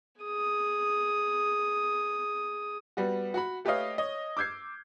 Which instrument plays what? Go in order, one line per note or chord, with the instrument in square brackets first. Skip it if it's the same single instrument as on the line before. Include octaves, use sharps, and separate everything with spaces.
[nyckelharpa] G#4 D#6
[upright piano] G3 B3 F#4
F#4 F#5 B5
A3 G4 B4 C#5 D#5 F5
C#5 D#5
D6 E6 G6 G#6 C7